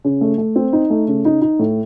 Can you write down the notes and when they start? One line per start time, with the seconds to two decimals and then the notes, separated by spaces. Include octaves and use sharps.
0.05 C#3
0.21 A3
0.38 A3
0.56 C4
0.73 D#4
0.90 A3
1.08 C#3
1.25 D#4
1.42 D#4
1.59 A2